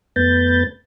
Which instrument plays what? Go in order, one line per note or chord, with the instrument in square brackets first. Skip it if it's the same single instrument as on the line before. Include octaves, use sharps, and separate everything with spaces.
[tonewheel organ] F2 A3 B3 B4 G6 A6